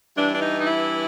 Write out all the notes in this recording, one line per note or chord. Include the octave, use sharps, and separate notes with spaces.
G2 E3 D4
D4
D#4
D#4
E4